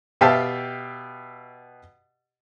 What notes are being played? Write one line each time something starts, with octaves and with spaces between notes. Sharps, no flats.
B2 G4 E5 F5 G5 A5